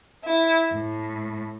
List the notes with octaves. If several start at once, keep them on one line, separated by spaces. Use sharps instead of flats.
E4
A2